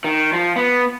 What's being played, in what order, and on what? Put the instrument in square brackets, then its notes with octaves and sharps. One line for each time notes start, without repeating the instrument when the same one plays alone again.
[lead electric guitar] D#3
F3
B3